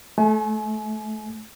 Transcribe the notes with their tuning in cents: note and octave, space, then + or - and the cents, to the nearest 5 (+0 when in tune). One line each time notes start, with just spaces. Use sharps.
A3 -25 G#5 +35